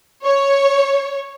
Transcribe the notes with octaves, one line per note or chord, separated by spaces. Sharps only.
C#5